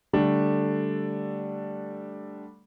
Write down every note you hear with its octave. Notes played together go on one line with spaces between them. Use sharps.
D3 G3 A3 D4